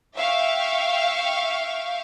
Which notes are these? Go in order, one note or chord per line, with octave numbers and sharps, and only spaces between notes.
E5 F5 G5 C#6